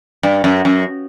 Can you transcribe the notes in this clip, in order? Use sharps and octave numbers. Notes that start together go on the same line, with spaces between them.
G2
F#2
F#2